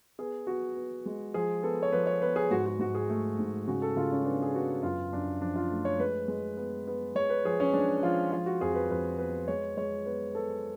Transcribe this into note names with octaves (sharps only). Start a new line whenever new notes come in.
B3 G#4
B3 F#4
B3
G#3
F3 G#4
B3 A4
C#5
F3 B4
C#5
B3 B4
G#4
G#2 F#4
F#4
G#2 F#4
G#4
A3
G#2
C#3 F#4
A4
C#3 F4
C#4
B3 D4
G#4
B3 F#4
F#2 F4
F#2 D4
F3 D4
F4
A3
C#5
G#3 B4
G#3
B3
B3
G#3 C#5
B4
F3 G#4
C#4
G#3 D4
F3 F4
F3 F4
F#4
F2 G#4
B4
F2 B4
B3 B4
G#3 C#5
G#3 C#5
B3 B4
B3 A4